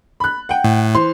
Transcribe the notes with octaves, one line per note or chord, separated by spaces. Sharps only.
B5 F#6
F#5 G5
A2
E3 C5 C6